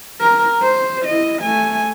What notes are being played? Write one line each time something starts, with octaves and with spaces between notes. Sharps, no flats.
A#4
C5
E4 D#5
A3 G#5